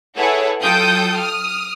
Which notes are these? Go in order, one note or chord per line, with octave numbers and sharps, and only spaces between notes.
E4 G#4 A4 B4 C#5 F#5
F#3 F4 A4 G5 D#6 G6
D#6 F6